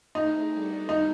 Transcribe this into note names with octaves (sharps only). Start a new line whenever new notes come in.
A3 C4 D#4 E4 G#4
G3 B3 D4 F#4 A4
D#4